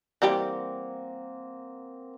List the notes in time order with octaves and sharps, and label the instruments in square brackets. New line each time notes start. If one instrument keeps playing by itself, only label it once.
[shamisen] E3 G3 G4 [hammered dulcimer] A#3 C4 F#5